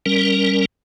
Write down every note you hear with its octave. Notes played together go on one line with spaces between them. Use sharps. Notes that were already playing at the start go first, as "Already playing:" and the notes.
G3 C#4 A#4